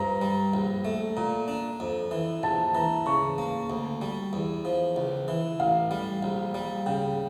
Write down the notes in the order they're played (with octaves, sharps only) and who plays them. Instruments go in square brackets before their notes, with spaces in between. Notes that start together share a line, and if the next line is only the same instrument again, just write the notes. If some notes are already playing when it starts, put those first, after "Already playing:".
Already playing: [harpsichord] G2 F3 [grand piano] A#5
[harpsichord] G3
A#1
A3
[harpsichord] A#2 [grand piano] A#5
[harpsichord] D4
F2
E3
[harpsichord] A#1 [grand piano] A5
[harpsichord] E3 [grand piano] A#5
[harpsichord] C#3 [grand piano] C#6
[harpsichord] A#3
D2
G3
E2
F3
C#2
E3
[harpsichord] A1 [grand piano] F5
[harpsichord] G3
A#1
G3
[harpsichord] C#3 [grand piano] G5